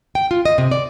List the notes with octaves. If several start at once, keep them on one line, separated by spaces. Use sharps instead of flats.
G5
F4
D#5
C3
D5